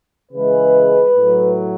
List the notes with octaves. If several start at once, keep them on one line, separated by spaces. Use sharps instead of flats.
C#3 E3 G#3 B4
A2 F#3